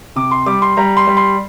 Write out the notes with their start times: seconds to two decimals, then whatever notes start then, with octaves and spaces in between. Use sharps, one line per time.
0.16 C3 D6
0.31 C6
0.46 G3 D6
0.62 C6
0.77 G3 A#5
0.97 C6
1.07 G3
1.17 C6